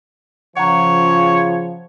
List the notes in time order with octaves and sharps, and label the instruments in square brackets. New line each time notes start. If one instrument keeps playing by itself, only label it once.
[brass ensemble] C#3 F3 [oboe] C#5 [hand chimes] F#5 A#5